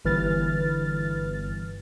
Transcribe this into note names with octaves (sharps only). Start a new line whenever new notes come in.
G1 E3 B4 F6 A6